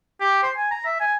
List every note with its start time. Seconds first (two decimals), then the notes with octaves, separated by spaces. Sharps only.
0.21 G4
0.43 C5
0.57 G#5
0.71 A#5
0.86 E5
1.00 G#5